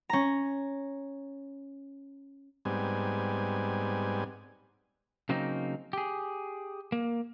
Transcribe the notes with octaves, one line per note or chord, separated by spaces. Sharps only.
C#4 A#5
G#2 G3 B3 C4 G#5
C#3 F#3 A#3 C4 D#4
G4 G#4
A#3